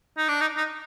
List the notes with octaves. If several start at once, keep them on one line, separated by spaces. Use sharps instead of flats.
D#4
D4
D#4
D#4